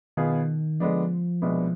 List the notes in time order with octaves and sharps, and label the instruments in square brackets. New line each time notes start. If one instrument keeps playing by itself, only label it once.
[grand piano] B2 B3 F4 G#4 [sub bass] D#3
[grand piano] D3 G#3 B3 D4 [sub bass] F3
[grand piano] C2 B2 G#3 B3 D4